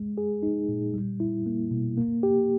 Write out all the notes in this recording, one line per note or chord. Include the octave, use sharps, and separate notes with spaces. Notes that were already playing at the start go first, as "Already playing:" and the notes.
Already playing: G#3
G#4
D#4
A#2
G3
E4
A#3
B2
A#3
G4